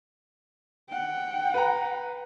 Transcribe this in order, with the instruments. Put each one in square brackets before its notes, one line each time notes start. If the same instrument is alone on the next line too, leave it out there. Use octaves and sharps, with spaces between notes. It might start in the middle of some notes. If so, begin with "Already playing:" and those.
[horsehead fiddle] F#5 G5
[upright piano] B4 A#5